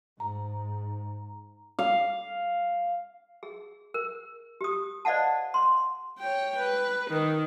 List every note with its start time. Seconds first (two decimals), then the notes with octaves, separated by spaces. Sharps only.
0.20 G#2 A#5
1.79 F5
3.43 G#4
3.94 A#4
4.61 G4 D#6
5.05 C5 D5 D#5 F5 F#5 A5
5.54 C6
6.19 C#5 G5
6.58 B4
7.10 D#3